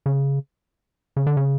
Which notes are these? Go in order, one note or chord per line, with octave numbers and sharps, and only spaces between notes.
C#3
C#3
D3
C#3